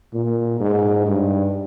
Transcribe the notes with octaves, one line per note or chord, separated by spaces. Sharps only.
A#2
G#2
G2